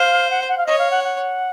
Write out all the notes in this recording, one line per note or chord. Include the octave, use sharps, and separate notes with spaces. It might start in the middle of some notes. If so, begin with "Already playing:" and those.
Already playing: C5 F5
F#5
F#5
F5
C#5 D#5
F5
F#5
F#5